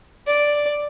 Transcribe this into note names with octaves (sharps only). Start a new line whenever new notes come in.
D5